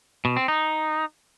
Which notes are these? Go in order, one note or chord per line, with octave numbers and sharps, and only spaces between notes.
B2
C4
D#4